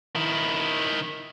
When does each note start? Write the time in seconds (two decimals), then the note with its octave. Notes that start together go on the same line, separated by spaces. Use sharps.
0.16 D#3 E4